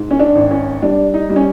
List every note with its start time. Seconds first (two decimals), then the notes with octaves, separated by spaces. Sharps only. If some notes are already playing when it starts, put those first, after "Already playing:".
Already playing: G#2
0.11 C#4
0.19 D4
0.35 G#1
0.51 C#4
0.82 G3 D4
1.14 D#4
1.30 G3
1.36 C#4